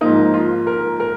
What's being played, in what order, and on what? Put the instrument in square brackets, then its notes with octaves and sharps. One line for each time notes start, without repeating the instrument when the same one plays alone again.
[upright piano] G#2 F3 A#3 D#4
F4
A#4
A#4